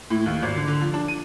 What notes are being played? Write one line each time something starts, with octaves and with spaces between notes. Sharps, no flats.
A2
D#2
G#1
D3
D3
F3
D4
D#7